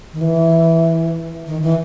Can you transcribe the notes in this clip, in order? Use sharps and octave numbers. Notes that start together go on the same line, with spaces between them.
D#3
E3
D#3
E3